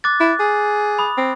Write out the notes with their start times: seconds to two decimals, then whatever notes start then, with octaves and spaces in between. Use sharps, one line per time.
0.04 D6 F#6 A6
0.20 E4
0.40 G#4
0.99 B5 D#6
1.18 C4